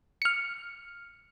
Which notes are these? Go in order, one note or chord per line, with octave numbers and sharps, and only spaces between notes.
F6 C#7